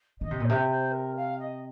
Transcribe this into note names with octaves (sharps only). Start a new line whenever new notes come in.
D#3 D#5
C3
A#2
C3 C5
C5
A#4
F5
D#5